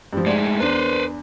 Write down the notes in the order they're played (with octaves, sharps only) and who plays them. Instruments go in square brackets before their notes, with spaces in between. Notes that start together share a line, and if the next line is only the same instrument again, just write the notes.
[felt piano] G2 F3
[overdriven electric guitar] A2 G#3 [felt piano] D5
[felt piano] E2 D4 [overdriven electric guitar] B4 C5